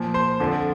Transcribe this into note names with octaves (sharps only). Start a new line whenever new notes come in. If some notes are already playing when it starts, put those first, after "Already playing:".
Already playing: A#2 F3
C5 C6
F2 D3 F3